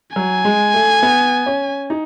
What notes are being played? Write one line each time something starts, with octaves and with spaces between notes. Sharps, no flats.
F#3 G#5
G#3
A3
B3
C#4
D#4